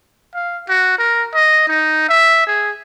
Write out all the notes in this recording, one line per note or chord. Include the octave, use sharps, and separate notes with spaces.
F5
F#4
A#4
D#5
D#4
E5
G#4